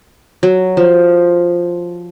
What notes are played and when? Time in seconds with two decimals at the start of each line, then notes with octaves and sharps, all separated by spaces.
0.43 F#3
0.77 F3